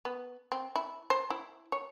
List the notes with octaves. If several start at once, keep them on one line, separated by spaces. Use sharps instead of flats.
B3
C4
E4
C5
E4
C#5